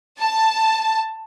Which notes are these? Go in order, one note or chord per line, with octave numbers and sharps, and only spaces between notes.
A5